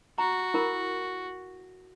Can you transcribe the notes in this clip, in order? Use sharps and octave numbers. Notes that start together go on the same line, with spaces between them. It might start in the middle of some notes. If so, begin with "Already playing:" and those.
F#4 A#5
E4 A#4 B5